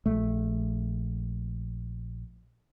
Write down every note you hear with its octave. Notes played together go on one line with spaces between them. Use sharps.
A#1 A3